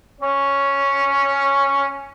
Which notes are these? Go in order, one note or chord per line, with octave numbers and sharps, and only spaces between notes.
C#4 C#5